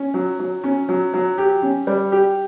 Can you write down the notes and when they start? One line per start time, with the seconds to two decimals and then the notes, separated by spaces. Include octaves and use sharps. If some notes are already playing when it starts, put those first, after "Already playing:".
Already playing: C#4
0.14 F#3
0.39 F#3
0.64 C#4
0.89 F#3
1.14 F#3
1.38 G4
1.62 C#4
1.87 G3
2.12 G4